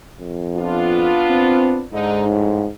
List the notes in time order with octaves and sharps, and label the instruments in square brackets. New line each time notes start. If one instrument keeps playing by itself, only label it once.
[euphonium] F2
[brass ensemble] B3 D4 F4
[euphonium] C4
[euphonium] G#2 [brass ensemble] D3 D#4
[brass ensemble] F2 A2